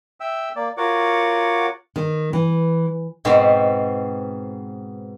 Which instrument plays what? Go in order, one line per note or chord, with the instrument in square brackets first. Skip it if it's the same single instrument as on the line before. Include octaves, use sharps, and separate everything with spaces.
[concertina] E5 G5 E6
A#3 D5
F4 F#4 A#4 C#5 F#5 D6
[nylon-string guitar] D#3
E3
[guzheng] G#2 B2 B3 C4